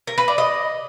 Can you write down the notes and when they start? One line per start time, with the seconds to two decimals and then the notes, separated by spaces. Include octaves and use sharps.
0.07 A#4
0.18 B4
0.28 D5
0.38 D#5